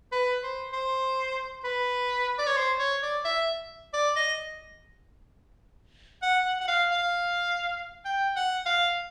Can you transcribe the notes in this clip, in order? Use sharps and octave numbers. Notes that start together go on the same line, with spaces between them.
B4
C5
C5
B4
D5
C#5
C5
C#5
D5
E5
D5
D#5
F#5
F#5
F#5
F5
F5
G5
F#5
F5